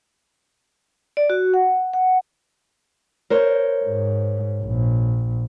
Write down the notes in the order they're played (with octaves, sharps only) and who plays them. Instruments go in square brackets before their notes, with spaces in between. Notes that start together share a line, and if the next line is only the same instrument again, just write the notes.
[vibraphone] D5
F#4
F#5
F#5
[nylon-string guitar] A#4 C5 C#5
[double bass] G#2
A#1